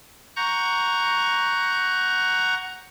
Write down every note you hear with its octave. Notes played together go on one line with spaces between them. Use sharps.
F#5 A#5 C#6 F#6 G6 A#6